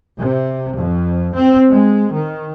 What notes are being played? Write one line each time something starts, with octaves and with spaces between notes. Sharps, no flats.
C3
F2
C4
G#3
D#3